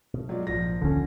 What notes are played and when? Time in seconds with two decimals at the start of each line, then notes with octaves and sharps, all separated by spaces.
0.14 B2
0.29 F#3 G#3 F4 D5
0.47 A#1 G#2 F3 A#6
0.82 D1 D3 C#4